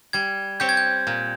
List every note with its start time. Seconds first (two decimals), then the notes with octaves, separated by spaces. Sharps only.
0.13 G3 G#6
0.60 C4 G4 C#5 G6
0.69 G#6
0.77 G6
1.07 A#2